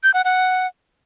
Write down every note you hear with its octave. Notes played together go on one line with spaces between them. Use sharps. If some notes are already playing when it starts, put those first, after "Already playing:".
G6
F#5
F#5